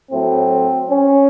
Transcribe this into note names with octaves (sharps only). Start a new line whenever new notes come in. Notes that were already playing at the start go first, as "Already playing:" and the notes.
A2 F#3 A3 C4
C#4